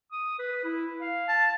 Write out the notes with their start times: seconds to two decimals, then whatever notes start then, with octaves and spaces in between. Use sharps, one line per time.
0.12 D#6
0.39 B4
0.64 E4
1.01 F5
1.28 A5